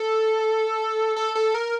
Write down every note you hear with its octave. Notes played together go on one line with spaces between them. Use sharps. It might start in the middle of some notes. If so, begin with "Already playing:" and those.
Already playing: A4
A4
A4
A#4